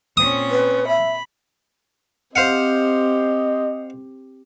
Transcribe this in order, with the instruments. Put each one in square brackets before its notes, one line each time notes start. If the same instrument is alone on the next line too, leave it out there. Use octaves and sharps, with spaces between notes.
[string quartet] A#2 C4 C#4 [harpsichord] D#6
[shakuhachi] B4
[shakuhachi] E5 [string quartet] B5
[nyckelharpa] C4 G4 [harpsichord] C5 F5 F#5 [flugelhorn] D#5